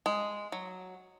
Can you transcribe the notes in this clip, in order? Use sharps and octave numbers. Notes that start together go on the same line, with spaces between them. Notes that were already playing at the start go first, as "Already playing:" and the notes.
G#3
F#3